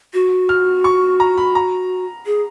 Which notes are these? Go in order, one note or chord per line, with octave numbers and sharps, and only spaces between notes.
F#4
F6
C#6
A#5
B5
A#5
G#4